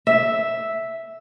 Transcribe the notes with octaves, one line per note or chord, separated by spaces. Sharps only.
E5